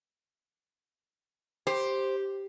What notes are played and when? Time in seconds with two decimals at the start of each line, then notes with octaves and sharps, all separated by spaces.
1.67 G4 C5